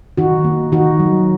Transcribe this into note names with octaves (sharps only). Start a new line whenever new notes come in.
D#3 D#4 F#4
A#3
D#3 D#4 F#4
F#3